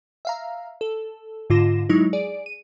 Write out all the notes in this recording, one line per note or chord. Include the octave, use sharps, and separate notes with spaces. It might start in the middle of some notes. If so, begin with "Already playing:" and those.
E5 F5 A#5
A4
G#2 D3 F4 D6 A#6 E7
F#3 G#3 D#4 E4
G#4 D5 D7
D#7